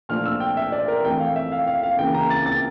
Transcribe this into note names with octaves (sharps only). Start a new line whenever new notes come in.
A#2 F3 A3 D4 F6
E6
G5
E5
D5
A#4
F2 E3 A3 G5
F5
E5
F5
F5
F5
C#3 E3 A#3 G5
A#5
A6
A6